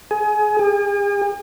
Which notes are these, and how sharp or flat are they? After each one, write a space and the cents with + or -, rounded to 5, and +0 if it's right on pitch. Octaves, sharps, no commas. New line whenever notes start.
G#4 +25
G#4 -45